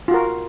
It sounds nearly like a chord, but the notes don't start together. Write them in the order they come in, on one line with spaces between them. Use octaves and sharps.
F4 F#4 A#4